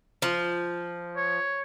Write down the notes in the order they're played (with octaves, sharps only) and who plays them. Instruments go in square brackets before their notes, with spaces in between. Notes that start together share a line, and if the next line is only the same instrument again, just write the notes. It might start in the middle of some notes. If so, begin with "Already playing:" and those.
[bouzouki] F3
[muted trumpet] C#5